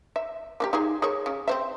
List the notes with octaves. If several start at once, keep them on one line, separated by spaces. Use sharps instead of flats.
E5
A#3 E4 G4
D#4 G4 G#4
G#4 A#4 C#5
C#3
C4 C5 E5